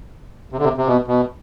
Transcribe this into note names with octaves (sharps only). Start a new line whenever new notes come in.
C3
D3
C3
C3
B2
B2